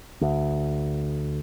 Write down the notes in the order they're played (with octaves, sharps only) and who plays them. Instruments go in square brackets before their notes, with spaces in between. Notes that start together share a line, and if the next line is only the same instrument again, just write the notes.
[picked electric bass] D2